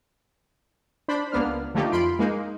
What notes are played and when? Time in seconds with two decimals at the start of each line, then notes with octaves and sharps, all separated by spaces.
1.08 D4 C5 B5
1.32 C#2 A#3 B3 D4 F6
1.74 D3 F3 A3 A#3 D#4 G4
1.92 F2 F4 B5 C6 D7
2.19 G#3 A#3 D#4